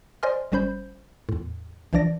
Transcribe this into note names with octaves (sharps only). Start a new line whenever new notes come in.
C5 D5 D#5 G#5 C6 F6
G1 G3 C#4 C5 B5 G6
E2 A2
C2 E3 F3 D4 D5 A#6